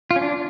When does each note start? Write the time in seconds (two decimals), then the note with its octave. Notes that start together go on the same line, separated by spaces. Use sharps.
0.11 F4
0.16 C#4
0.21 D4